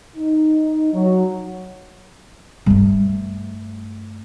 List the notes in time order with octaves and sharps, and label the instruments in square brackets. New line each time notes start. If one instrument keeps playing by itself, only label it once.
[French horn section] D#4
F#3
[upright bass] G2 A3